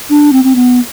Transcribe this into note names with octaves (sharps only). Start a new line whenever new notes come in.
D4
C4
C4
B3